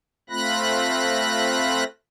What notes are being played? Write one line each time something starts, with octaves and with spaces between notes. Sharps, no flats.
A3 C4 F4 B5 F#6 A#6